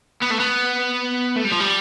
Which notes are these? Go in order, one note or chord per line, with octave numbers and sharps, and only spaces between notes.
B3
A3
B3
A3
G3
F3
G3